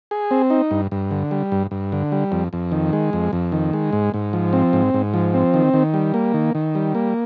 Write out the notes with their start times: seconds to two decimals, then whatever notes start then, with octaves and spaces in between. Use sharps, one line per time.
0.11 G#4
0.31 C4
0.50 D#4
0.71 G2
0.92 G2
1.11 D3
1.31 G3
1.52 G2
1.71 G2
1.92 D3
2.12 G3
2.32 F2
2.53 F2
2.72 D#3
2.93 G#3
3.13 F2
3.33 F2
3.52 D#3
3.73 G#3
3.93 G#2
4.14 G#2
4.33 F3
4.53 C4
4.73 G#2
4.94 G#2
5.14 F3
5.34 C4
5.54 D#3
5.73 D#3
5.94 G3
6.14 A#3
6.34 D#3
6.55 D#3
6.75 G3
6.95 A#3